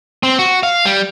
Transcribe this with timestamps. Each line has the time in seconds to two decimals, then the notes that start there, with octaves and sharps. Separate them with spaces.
0.23 C4
0.39 F#4
0.63 F5
0.85 G3